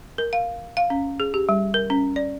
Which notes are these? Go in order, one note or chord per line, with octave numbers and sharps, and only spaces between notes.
A#4
F5
F5
C#4
G#4
G4
G3
A#4
C#4
D5